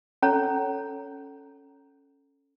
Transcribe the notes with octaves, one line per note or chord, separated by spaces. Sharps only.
C#4 A4 C#5 A#5